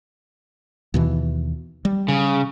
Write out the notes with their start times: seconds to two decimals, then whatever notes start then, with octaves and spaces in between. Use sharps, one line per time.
0.94 D#2 B2 E3
1.85 G3
2.08 C#3